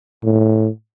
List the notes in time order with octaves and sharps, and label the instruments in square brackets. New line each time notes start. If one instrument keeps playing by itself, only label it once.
[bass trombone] A2